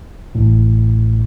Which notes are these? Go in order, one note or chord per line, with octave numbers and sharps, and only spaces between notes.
A1 A2